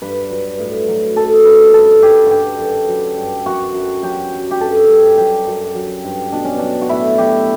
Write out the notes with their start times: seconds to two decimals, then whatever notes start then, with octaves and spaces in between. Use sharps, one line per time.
0.02 G2 B4
0.29 F#3
0.59 A2
0.88 F#3
1.16 F#2 A4
1.45 D3 B4
1.74 G2 A4
2.02 G2 G4
2.26 D3 F#4 G4
2.59 F#2
2.88 F#3
3.17 G2
3.46 F#2 F#4
3.74 F#2
4.03 F#3 G4
4.32 F#3
4.51 G4
4.60 G2 A4
4.89 G2
5.18 F#3 G4
5.46 F#2
5.75 F#3
6.04 G2
6.32 B2 D4
6.45 C#4
6.58 F#3 D4
6.82 F#4
6.89 A2 E4
7.18 F#3 G4